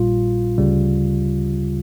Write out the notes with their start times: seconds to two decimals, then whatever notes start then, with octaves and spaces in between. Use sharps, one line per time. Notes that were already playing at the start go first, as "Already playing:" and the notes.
Already playing: A#1 A#2 G3 F4
0.58 D2 C#3 G3